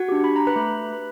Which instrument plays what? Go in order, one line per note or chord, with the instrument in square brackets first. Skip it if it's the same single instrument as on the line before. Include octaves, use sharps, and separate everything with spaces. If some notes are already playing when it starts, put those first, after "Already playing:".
Already playing: [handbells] F#4 F#5
D4 G4
B5
A#5
B4 B5
A3